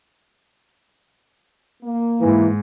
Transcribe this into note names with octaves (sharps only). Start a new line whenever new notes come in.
A#3
G#2 E3